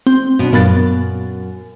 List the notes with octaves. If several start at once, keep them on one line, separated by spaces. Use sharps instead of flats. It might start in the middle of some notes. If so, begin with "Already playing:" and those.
C4
B2 D4
F#2 A#2 B3 A6